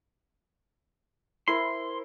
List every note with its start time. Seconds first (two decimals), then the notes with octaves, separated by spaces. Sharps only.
1.48 E4 A#4 C5 C6